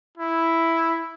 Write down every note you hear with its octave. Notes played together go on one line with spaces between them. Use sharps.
E4